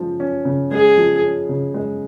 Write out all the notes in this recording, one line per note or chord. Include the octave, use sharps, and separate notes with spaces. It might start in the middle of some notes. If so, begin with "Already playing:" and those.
Already playing: C#3 F3 G#3
C#4
C#3
G#3 G#4
F3
C#4
C#3
G#3